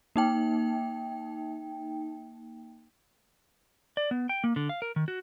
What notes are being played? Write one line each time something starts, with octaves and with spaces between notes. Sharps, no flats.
A#3 D#4 G5
D5
B3
G5
A#3
D3
F5
A#4
D#3
F#4